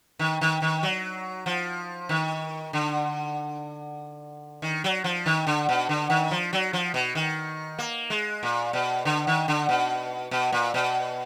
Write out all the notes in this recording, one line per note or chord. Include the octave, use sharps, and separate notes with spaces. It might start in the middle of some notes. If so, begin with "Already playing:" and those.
D#3
D#3
D#3
F#3
F3
D#3
D3
D#3
F#3
F3
D#3
D3
B2
D3
D#3
F3
F#3
F3
B2
D#3
A#3
G#3
A#2
B2
D3
D#3
D3
B2
B2
A#2
B2